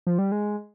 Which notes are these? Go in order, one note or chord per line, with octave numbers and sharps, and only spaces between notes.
F3
G3
G#3